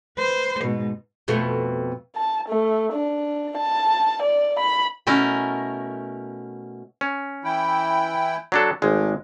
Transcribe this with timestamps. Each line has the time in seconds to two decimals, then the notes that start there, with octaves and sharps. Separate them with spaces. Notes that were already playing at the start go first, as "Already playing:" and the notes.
0.17 B4 C5
0.63 G#2 B2
1.28 F2 B2 A3
2.16 A5
2.48 A3
2.93 D4
3.58 A5
4.22 D5
4.59 B5
5.07 B2 A3 C#4 E4 A#4
7.01 C#4
7.44 E3 E4 G5
8.52 F#3 D4 A4
8.82 G#1 G#3 A3